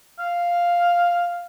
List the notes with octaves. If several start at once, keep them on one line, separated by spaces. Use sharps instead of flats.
F5